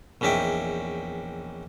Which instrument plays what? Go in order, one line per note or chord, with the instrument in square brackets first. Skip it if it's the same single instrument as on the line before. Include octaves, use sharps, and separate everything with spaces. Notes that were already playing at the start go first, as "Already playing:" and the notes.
[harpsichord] A#1 E2 C#4 D#4 E5 G5